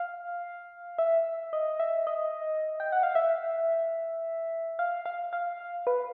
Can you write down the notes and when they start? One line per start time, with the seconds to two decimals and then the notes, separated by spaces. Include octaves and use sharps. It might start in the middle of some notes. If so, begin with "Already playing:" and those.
Already playing: F5
0.98 E5
1.53 D#5
1.80 E5
2.07 D#5
2.80 G5
2.92 F#5
3.03 F5
3.15 E5
4.79 F5
5.06 F5
5.33 F5
5.87 B4